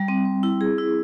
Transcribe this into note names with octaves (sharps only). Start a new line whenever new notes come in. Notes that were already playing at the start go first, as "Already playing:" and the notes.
Already playing: G3
C4
C4
E4
G#4
E4